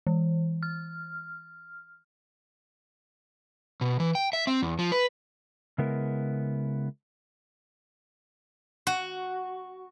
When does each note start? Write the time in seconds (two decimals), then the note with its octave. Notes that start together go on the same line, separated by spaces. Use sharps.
0.07 E3
0.63 F6
3.81 B2
4.00 E3
4.15 G5
4.33 E5
4.47 C4
4.62 E2
4.79 F3
4.92 B4
5.78 C#3 G#3 B3 E4 A#4
8.87 F#4